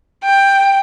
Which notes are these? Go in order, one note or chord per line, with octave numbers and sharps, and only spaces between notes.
G5